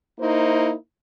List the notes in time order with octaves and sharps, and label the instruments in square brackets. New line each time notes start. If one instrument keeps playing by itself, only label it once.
[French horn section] A#3 D#4 E4 C5